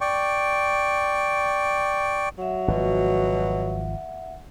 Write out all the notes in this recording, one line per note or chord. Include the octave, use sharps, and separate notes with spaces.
D5 G5 C#6
F#3 E5 F#5
G#1 B2 F3